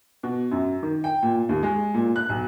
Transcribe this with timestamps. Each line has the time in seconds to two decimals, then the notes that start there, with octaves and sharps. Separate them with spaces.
0.23 B2
0.51 F#2
0.83 D#3
1.04 G5
1.23 A#2
1.49 D#2
1.63 G#3
1.94 A#2
2.16 F#6
2.29 B1